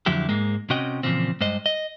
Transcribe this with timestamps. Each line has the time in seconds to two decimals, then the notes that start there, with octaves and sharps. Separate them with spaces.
0.06 F2 D3 F#3 E4 G4
0.29 G#2 G#3 A#3
0.70 C3 C#4 F#4 D#5 G5
1.03 A#2 C#3 E3 F3 C4
1.41 G2 G#3 C5 D#5
1.66 D#5